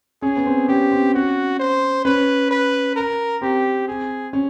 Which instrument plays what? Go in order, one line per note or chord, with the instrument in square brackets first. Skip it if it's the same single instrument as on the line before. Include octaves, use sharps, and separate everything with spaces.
[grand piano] C#4 [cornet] G#4
[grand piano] B3
C4
[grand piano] C#4 [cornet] G4
[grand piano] C4
[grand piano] C#4 [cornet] F#4
[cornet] C5
[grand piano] C#4 [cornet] B4
[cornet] B4
A#4
[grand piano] C4 [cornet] G4
[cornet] G#4
[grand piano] C#4